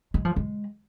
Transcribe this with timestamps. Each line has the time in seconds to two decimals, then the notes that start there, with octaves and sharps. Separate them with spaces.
0.14 G#3
0.25 F3
0.36 G#3